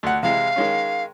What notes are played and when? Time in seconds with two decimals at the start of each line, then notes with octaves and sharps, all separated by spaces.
0.03 D2 F#5
0.23 C3 E3 G#3 F5
0.56 D#3 G#3 C#4